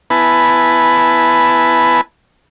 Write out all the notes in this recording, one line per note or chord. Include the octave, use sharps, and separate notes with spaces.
B3 E4 B4 G#5 A5 B5